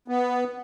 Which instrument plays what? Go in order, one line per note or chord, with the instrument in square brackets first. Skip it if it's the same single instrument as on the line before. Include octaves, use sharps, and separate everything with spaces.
[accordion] B3